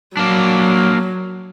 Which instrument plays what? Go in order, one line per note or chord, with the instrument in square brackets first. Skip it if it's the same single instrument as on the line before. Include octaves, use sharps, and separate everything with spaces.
[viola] F#3 [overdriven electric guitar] A#3 D4